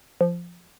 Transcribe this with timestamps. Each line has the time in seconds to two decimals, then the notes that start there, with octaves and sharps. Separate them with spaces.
0.21 F3